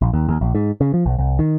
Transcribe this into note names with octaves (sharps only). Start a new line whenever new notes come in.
A#1
D#2
D#2
A#1
G#2
C#3
F3
B1
C2
D#3